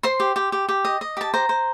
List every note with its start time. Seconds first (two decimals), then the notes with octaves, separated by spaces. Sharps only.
0.03 C5 C6
0.20 G4
0.36 G4
0.52 G4
0.69 G4
0.85 D#5
1.01 D#5
1.17 G4 A5
1.34 C5 A#5
1.49 C5